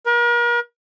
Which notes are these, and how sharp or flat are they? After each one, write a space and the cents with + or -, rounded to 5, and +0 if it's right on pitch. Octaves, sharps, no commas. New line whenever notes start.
A#4 +40